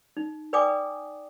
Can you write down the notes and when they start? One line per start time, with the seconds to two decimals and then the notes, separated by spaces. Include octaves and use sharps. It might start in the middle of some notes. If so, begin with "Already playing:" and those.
0.17 D#4
0.53 B4 D5 G5 G#5 D6 D#6